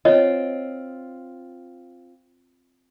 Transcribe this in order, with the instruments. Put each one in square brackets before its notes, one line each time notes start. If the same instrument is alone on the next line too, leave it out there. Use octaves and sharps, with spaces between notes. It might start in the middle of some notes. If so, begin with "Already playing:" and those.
[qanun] C4 F4 [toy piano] C#5 D#5